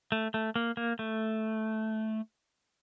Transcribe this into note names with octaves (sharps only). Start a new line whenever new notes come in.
A3
A3
A#3
A#3
A3